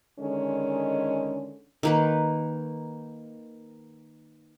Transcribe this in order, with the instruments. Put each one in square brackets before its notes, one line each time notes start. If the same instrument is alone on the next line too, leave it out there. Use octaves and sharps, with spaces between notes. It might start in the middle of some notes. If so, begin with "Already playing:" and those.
[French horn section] D3 D#3 G#3 C#4
[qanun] D#3 A#3 B4